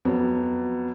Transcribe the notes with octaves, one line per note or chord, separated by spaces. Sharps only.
F2 F#3 B3